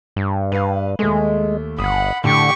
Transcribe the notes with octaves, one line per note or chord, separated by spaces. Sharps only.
G2
G2 B4 F5
D#2 G#3 A3
G1 F#5 B5 D#6
A2 D3 G4 C#6